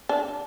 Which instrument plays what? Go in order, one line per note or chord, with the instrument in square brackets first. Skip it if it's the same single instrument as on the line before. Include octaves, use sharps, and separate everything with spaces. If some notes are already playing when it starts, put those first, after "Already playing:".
[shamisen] D4